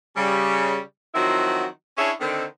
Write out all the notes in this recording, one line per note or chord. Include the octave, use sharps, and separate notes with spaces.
C#3 G3
D#3 F3 F#3 C4 E4 F#4
C#4 D4 E4 G#4 C#5 E5
D3 D#3 C4